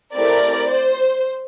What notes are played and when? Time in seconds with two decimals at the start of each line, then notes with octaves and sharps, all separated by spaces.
0.15 A3 C4 E4 G4 A#4 D5
0.69 C5